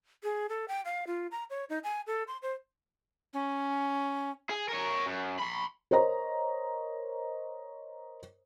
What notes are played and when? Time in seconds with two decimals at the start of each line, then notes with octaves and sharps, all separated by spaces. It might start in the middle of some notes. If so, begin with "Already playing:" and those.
0.23 G#4
0.49 A4
0.68 G5
0.85 F5
1.07 F4
1.31 A#5
1.50 C#5
1.70 D#4
1.84 G#5
2.07 A4
2.28 C6
2.42 C5
3.33 C#4
4.50 G#4
4.68 A#4 C#5
5.06 F#2
5.39 B5 C6
5.91 A#4 C5 C#5 D#5 A#5